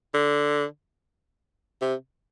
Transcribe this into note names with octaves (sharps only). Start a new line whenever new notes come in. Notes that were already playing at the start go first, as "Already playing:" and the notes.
D3
C3